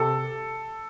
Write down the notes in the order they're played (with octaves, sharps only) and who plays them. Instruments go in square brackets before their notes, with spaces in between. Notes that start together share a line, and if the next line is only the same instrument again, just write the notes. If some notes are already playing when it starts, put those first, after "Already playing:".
Already playing: [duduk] C3 [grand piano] A4